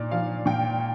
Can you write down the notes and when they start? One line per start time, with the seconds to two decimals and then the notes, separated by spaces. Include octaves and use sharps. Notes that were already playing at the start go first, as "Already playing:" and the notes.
Already playing: A#2 D5
0.11 F3 F5
0.46 A#2 G5